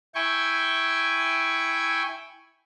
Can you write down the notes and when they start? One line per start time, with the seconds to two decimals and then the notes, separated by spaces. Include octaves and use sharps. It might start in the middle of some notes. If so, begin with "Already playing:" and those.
0.15 E4 G5 G#5 C#6